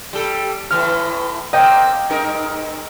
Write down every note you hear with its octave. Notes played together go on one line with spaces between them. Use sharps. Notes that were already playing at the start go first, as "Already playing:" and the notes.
G3 A4
A2 E3 F6
A#3 C4 D#5 G5
G2 D#4 A#4